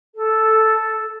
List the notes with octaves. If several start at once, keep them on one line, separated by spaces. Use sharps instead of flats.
A4